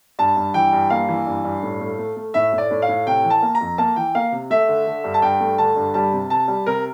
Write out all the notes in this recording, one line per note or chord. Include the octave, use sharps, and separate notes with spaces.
G2 A5
G2
E3 G5
G2
A#3 F5
E3
G2
G2
A2
A3
A3
A3
A2 E5
A2
D5
A2
F5
A2
C3 G5
E3
A5
A#3
A#5
F2
A#3 A5
E3 G5
A#3 F5
C3
A3 E5
D3
D3
G2
A5
G2 G5
A3
D3 A5
G2
G3 A5
C3
C3 A5
G3
C3 A#4